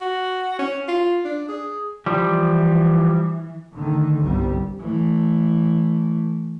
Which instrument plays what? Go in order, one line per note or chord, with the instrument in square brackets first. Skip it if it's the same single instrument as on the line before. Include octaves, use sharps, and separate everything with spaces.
[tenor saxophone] F#4
C#4
F4
D4
G#4
[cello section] E3 [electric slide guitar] F3 G3
[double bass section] D3 D#3 A3
G1 C2 G3 C4
[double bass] E3 A3